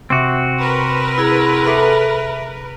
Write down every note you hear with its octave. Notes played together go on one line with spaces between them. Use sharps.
C3 C4 F#4 D6 E7
A#4 B4
E4 G#4
G#4 A4 E5 D6